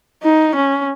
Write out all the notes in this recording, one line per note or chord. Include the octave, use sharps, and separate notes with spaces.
D#4
C#4